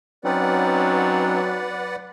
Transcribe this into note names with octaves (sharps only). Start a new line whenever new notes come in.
F#3 C4 C#4 D#4 B4 D5 F#5